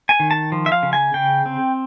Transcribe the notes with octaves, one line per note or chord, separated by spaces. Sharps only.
G#5
D#3
A5
F3
E5
F5
C#3
G#5
C#3 G5
C4